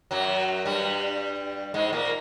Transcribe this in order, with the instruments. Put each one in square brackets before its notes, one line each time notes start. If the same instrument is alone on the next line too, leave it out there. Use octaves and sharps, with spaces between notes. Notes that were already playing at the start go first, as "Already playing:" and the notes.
[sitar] F#2 F#3
G2 G3
G#2 G#3
A#2 A#3